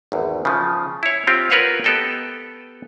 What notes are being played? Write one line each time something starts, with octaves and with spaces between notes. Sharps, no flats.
G#1 E2
C#3 F3
E4 C#5
C4 F4 G4
F4 A#4 B4 C#5 F5 F#5
B3 G4 A4 D#5 G5